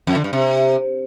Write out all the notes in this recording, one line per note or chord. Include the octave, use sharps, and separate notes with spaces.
F2
D3
G2
C3